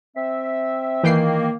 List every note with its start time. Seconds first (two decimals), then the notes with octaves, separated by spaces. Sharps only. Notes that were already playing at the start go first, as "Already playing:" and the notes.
0.16 C4 E5
1.03 D#3 E3 A#3 G5 C7